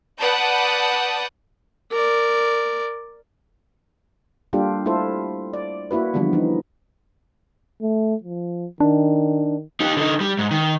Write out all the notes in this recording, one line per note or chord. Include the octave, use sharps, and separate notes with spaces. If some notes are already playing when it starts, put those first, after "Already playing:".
B4 D5 F#5 A5 D#6 G6
A#4 D5
G3 A#3 D4 F4 G4 A4
A3 E4 F4 A4 C5
D5
A#3 E4 F#4 B4
D3 E3 F3 G3 B3
E3 D#4
A3
F3
D#3 D4
D#4 G4
D3 D#4
G3
G#2
D#3